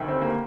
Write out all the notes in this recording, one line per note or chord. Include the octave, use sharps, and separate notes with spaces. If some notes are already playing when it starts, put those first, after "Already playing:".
Already playing: D2 C3 D#3
C4
A#3